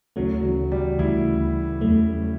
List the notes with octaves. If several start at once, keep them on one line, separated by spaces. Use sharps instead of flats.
D2 C#3 E3 F#3 A3
F#3
G3
D2 C#3 E3 A3 E4
E2 C#3 F#3 A3